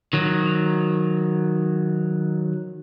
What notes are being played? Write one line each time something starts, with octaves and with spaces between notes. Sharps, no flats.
D#3 F#3